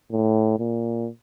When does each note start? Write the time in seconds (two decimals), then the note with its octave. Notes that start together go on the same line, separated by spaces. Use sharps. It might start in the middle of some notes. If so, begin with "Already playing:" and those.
0.12 A2
0.59 A#2